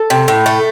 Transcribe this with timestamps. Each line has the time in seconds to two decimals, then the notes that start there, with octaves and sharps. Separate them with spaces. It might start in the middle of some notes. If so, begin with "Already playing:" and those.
Already playing: A4
0.10 C3
0.28 A2
0.46 A3